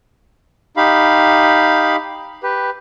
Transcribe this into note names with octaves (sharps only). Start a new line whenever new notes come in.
D#4 G4 F5 B5
G4 B4